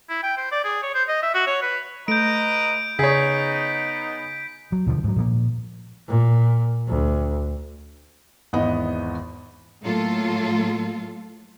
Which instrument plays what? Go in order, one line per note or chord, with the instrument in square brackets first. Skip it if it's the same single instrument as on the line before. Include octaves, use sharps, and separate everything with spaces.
[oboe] E4
G5
C5
D5
G#4
C#5
C5
D#5
E5
F#4
C#5
B4
[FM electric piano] A3 [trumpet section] B4 D#5 A#5 [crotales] G6 D7
[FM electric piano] C#3 [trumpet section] B3 D#4 [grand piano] G#4 C#5 [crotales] B6
[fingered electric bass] F#3
D#2 B2 D3 F3
G#2 F#3
A#2 F3 A#3
[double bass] A#2
D2
[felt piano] G#1 E2 B3 E4 D#5
[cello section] A2 F#3 A3 A#3 F4 A4